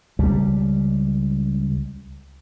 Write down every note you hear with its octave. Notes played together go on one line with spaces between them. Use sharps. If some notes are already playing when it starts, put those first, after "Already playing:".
C#2 G3